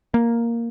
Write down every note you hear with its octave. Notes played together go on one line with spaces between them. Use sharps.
A#3